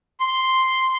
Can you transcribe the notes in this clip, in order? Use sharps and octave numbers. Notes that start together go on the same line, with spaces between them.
C6